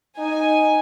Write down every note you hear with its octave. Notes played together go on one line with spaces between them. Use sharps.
D#4 G#5